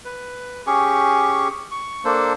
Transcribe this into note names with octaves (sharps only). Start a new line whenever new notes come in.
B4
C#4 G4 G#4 C#6
C#6
A#3 D4 A4 C5